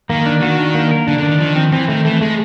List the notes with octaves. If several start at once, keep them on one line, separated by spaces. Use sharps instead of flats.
D#3 A#3
D4
D#3 F#4
D4
A#3
A#4
D3 D4
D3
D4
D#3
D#3 F3
C4
E3 C4
D#3 A3
E3 A3
G#3 A3